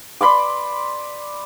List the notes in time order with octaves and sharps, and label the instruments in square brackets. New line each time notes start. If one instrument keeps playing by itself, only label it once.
[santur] D5 B5 C6 D6